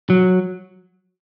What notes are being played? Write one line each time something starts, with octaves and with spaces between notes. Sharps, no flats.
F#3